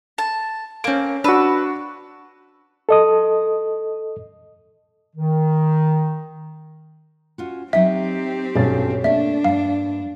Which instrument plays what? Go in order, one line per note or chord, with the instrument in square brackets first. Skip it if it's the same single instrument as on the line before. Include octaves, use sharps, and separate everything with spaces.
[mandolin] A5
[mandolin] A#3 C4 [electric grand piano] C#4 D7
[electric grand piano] D4 F#4 [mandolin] B4 E6
[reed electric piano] A4 D#5 D#6
[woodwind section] D#3
[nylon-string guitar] C#4 F4 F#4
[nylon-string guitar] F#3 D#4 G5 [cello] C4 G4 [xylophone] E5
[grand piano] B1 C#4 A6 [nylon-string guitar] G2
[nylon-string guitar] A3 A#3 [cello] D4 [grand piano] D5 [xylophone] E5
[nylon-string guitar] G2 A#3 [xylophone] F5